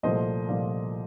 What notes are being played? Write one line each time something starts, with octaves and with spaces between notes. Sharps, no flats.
C2 A#2 F3 A3 C5 D#5
C2 A#2 F3 A3 D5 F5